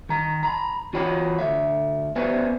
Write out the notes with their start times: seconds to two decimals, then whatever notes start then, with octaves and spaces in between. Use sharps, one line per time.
0.09 D#3 A#5
0.43 A#5 B5
0.93 E3 F4 F#4 C#5 F#5 B5
1.39 D2 E5
2.16 B3 B4 C5 D5 E5 G#5